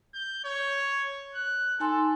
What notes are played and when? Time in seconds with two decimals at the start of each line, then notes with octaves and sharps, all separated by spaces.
0.14 G6
0.44 C#5
1.34 F#6
1.80 D#4 A4 G#5 C6